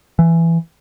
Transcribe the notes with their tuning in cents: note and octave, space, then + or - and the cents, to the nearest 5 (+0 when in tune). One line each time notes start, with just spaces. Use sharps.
E3 +15